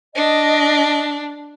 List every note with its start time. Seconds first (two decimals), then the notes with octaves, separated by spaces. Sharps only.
0.15 D4 D#5